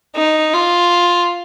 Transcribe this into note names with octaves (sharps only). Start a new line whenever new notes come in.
D#4
F4